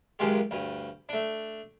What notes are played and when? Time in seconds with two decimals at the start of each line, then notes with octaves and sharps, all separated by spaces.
0.19 C#2 F#2 D#3 G#3 F4 G4
0.51 D2 G2
1.09 A3 D4